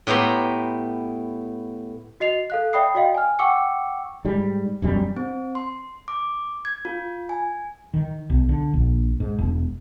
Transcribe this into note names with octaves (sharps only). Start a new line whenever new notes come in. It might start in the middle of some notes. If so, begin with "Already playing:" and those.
A2 B3 G4 A#5 C6
F#4 D#5 C7 F7
A4 F5 F#6
D5 E5 G5 B5 D#6 C7
F#4 D5 D#5 F5 G5
G#5 F6
F#5 G5 C#6 D6 E6 C#7
G#2 G3
E1 F#2 G3
C4
C6
D6
G#6
F4
G#5
D#3
B1
D3
A#1
G#2
E1